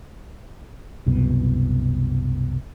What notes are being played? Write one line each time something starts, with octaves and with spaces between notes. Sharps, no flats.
C2 F#2 B2